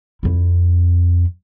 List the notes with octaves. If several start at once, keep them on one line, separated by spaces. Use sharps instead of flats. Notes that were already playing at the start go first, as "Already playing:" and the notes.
F2 E4